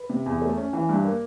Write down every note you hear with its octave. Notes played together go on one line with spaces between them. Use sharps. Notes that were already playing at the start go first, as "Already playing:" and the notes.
Already playing: B4
C3
E2
A3
C#4
E3
G2
A#3